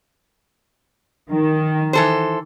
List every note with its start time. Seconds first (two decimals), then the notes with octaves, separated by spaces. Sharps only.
1.30 D#3
1.93 E3 A4 C5